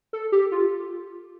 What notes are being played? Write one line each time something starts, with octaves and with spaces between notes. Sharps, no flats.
A4
G4
F4